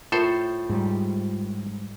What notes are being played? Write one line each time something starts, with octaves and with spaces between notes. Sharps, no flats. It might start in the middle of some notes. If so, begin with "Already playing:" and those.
A2 F4 A4 A#4 C5
G#2 G3